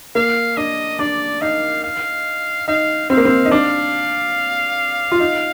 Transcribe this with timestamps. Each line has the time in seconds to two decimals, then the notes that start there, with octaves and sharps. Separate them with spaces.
0.15 A#3 F5
0.57 D4 D#5
0.99 D4 D5
1.42 D#4 F5
1.84 F5
2.68 D#4 F5
3.10 C4 F5
3.17 A#3
3.25 C4
3.45 D#4
3.51 D4 F5
5.12 F4
5.20 D#4